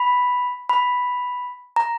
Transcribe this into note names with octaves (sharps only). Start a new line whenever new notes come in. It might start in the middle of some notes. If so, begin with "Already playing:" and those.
Already playing: B5
B5
A#5